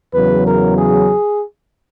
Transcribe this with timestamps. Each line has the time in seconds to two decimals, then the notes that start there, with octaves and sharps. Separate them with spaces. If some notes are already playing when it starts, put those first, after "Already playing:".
0.14 E2 C#3 F#3 B4
0.45 A#4
0.77 G#4